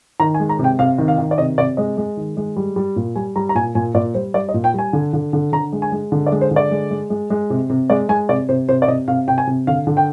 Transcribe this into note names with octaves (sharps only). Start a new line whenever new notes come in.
D#3 A#5
G#5
G#3
A#5
C3
G5
C3 F5
D#3
F5
D#3
D5
C3 D#5
C3 D5
G#3 D#5
G#3
D#3
G#3
G3
G3
A#2
G3 G#5
G3 A#5
A#5
A#2 G#5
A#2 G#5
A#2 D5
G3 C5
G3 D5
D#5
A#2
G5
G3 G#5
D3
D3
D3
D3 A#5
G#3
G#5
G#3
D3
D5
G#3
C5
D3
D5
G#3
G#3
G#3
G#3
C3
C3
G#3 D5
G#3 G#5
C3 D5
C3 C5
C3 C5
D5
C3 D#5
C3 F5
C3 G5
G#5
C3
D3 F5
D3
G5